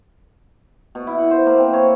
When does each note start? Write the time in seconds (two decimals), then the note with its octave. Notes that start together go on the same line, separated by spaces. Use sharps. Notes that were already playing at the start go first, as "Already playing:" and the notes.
0.95 B2
1.07 E4
1.18 F#5
1.31 C5
1.46 A#3
1.58 C4
1.73 C#5